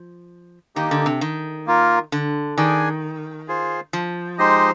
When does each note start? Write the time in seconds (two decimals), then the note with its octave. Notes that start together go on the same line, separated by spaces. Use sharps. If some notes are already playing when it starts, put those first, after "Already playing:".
Already playing: F3
0.76 D#3 A#3 D#4 G4
0.91 D3
1.06 C3
1.21 D#3
1.67 A#3 F4 A#4
2.12 D3
2.57 D#3 D4 G#4 D5 G#5
3.48 F4 G#4 C5
3.93 F3
4.38 G#3 D#4 G4 C5 D#5